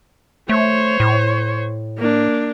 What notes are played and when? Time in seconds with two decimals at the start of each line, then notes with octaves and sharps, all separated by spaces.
0.49 A3 C5 C#5
1.00 A2
1.97 A#3 D4